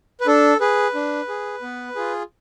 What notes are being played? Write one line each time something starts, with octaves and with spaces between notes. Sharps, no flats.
B4
D4 A4
G#4 B4
D4
G#4
B3
F4 G#4